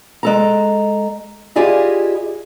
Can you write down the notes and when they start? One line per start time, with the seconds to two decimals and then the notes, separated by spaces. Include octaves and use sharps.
0.23 G#3 A4 A#5
1.56 E4 F4 G4 G#4 D5 D#5